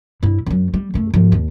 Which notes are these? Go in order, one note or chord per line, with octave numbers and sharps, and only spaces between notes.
G2 E4
F#2 F#3
G3
F#2 A3
G#2 F3
D#2